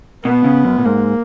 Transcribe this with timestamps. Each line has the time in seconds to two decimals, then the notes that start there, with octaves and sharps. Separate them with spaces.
0.25 B2 B3
0.44 C#3
0.64 F#2
0.78 A#2
0.85 G#2 A#3